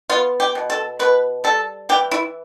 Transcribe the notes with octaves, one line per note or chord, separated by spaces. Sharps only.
B3 F4
G4
B2
A4
B2 B4
G3 A4
E3 G4
E4